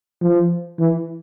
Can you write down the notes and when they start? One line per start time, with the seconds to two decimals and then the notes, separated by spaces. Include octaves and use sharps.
0.22 F3
0.79 E3